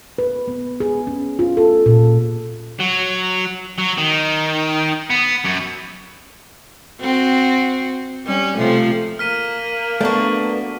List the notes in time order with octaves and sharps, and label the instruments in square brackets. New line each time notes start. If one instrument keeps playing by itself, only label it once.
[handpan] B4
B3
G#4
C#4
F4
A4
A#2
[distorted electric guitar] F#3
F#3
D#3
B3
F#2
[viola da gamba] C4 F#4
G3 C#4
C3 F3 A3
[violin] A#3 [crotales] F6 B6 D#7
[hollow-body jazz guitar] A3 B3 [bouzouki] D4 F#4